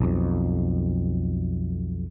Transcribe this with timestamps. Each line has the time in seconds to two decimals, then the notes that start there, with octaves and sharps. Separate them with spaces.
0.01 B1 F2